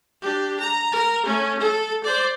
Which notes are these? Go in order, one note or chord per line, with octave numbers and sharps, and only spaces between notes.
D4 G4
A#5
A#4
A3 C#4
A4
C5 D5